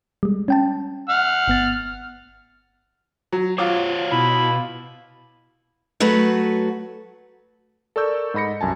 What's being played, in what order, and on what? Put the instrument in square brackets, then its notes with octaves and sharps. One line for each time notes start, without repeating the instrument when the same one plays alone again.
[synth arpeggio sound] G3 G#3
C#4 G5 A5
[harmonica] F#5 F6
[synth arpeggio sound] G1 B3 A6
[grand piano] F#3
[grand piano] F4 D6 [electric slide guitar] C5 C#5 F#5
[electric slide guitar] B2 [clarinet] E4
[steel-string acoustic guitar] F#3 A3 F#4 B4
[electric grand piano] A4 A#4 D5 C#6 E6 G6
G#2 D#5 B5 A#6 C#7
C2 F#2 G#5 A5